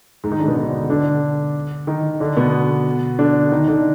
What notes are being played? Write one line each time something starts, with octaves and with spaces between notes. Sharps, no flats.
G#2 G#3
D#3 D#4
D3 D4
B2 B3
D3 D4
D3 D4
D#3 D#4
D3 D4
B2 B3
D3 D4
D#3 D#4
D3 D4